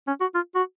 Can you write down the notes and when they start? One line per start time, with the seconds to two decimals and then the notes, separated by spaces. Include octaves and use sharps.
0.07 C#4
0.21 F#4
0.35 F4
0.55 F#4